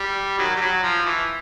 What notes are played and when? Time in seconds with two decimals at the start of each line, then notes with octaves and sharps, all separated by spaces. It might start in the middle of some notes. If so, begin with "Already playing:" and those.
Already playing: G3
0.38 D#3 F#3
0.56 G3
0.61 F#3
0.83 F3
1.05 E3